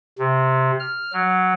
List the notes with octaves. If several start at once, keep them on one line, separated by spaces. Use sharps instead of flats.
C3
F6
F#3